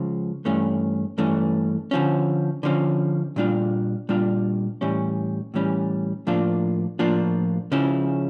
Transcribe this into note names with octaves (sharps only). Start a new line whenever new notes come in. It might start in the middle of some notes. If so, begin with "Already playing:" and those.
Already playing: C#2 C#3 F3
G2 E3 A3 C#4
G2 E3 A3 C#4
D3 F3 C#4
D3 F3 C#4
A#2 G3 D4 F4
A#2 G3 D4 F4
A2 E3 G3 C#4
A2 E3 G3 C#4
A2 F3 A#3 D4 F4
A2 F3 A#3 D4 F4
C#3 F3 C#4 E4